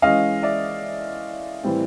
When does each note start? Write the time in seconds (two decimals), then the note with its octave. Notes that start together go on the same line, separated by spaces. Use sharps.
0.02 E3 G#3 C#4 D#5 F5
0.42 D5 E5
1.63 A2 E3 G3 C4